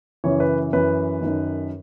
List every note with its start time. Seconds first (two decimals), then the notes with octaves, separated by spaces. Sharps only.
0.24 F#2 C#3 E3 C#5
0.40 B4
0.73 F#2 E3 B4
1.22 F#2 D#3